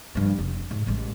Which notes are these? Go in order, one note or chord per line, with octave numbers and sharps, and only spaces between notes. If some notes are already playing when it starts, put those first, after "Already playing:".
G2 F3
F1
G#2
A1 G#3